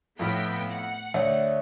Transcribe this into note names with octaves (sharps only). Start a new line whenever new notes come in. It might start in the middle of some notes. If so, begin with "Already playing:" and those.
F2 A2 B3 E4 G5 F6
F#5
D2 C#5 D5 E5